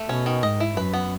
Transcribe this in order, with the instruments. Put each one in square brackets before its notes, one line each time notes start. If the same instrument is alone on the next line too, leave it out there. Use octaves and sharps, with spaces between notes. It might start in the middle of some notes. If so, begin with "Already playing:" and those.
Already playing: [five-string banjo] A3
[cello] B2 [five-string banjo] C#4
[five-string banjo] D#3
[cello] G#2 [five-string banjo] D#5
[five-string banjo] E4
[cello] F#2 [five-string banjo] B4
[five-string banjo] B3